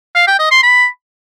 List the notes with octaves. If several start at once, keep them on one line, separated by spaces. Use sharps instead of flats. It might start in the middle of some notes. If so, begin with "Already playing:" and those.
F5
G5
D#5
C6
B5